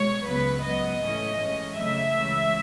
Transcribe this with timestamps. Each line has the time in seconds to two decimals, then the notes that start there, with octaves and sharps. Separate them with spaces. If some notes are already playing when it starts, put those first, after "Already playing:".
Already playing: B2 G#3 C#5
0.26 C#2 C#3 F#3 B3 B4
0.63 G#2 F#3 B3 D#5
1.01 A2 E3 A3 C#4
1.39 A2 G#3 C#4
1.77 F#2 C#3 F#3 A3 E5
2.14 C#2 C#3 E3